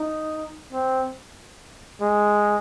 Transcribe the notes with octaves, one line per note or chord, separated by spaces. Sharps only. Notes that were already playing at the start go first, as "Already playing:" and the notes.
Already playing: D#4
C4
G#3